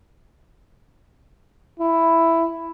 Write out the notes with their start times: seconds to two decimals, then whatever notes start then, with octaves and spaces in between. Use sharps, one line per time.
1.79 E4